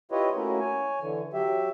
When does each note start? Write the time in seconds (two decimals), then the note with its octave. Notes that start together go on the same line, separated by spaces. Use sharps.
0.12 E4 F4 G4 B4 C#5 D#5
0.36 A3 A#3 C#4 E4 F#4 A#4
0.60 C#5 G#5
1.01 D3 E3
1.33 F#3 G4 E5